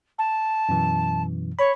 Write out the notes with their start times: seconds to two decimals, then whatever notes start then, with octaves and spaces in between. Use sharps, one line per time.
0.18 A5
0.69 F#2 B2 E3
1.59 C#5 B5